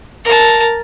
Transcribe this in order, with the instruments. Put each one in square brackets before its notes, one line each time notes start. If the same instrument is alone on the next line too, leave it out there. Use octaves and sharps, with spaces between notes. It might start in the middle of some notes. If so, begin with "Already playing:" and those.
[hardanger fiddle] A#4 A5